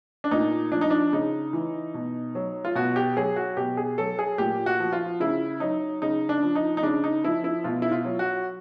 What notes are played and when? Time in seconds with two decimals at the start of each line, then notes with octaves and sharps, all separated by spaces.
0.24 D4
0.31 A#2 D#4
0.72 F3 D4
0.81 D#4
0.90 D4
1.12 C#3 D#4
1.53 E3
1.94 B2
2.35 F#3
2.65 F4
2.75 B2 F#4
2.96 G4
3.16 F#3 G#4
3.36 F#4
3.57 B2 G4
3.77 G#4
3.98 F#3 A4
4.19 G#4
4.38 A#2 G4
4.66 F#4
4.80 F3
4.93 F4
5.20 C#3 E4
5.60 F#3 D#4
6.02 C#3 D#4
6.29 D4
6.43 F3
6.55 D#4
6.77 D#4
6.83 C#3 D4
7.04 D#4
7.24 F3 E4
7.44 E4
7.64 B2 F4
7.82 E4
7.92 F4
8.05 F#3
8.19 F#4